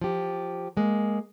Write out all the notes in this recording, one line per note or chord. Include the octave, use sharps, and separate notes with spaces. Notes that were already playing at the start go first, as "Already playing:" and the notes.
F3 G4
G#3 A#3